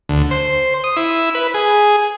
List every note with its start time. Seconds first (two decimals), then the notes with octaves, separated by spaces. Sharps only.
0.09 D2
0.31 C5
0.84 D#6
0.97 E4
1.35 B4
1.54 G#4